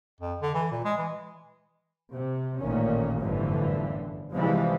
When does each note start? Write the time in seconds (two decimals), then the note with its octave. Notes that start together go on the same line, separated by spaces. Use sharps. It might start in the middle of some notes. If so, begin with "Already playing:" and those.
0.21 F2
0.41 D3
0.54 E3
0.72 A#2
0.84 G#3
0.98 E3
2.11 C3
2.58 A1 A#2 D#3 C#4
3.20 G1 F#2 A2 D3 E3 F3
4.33 C3 E3 F3 G3 G#3